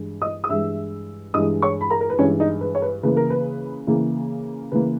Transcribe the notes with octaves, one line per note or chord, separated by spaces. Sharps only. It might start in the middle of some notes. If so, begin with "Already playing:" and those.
Already playing: G2 E3 G#3
D#5 D#6
D#6
G2 E3 G#3 E5 E6
G2 E3 G#3 D#5 D#6
C#5 C#6
B5
A#4 A#5
A#4
B4
G2 E3 G#3 C#4 C#5
D#4 D#5
B4
C#5
B4
C#3 E3 A#3 B4
A#4
B4
C#3 E3 A#3
C#3 E3 A#3 B4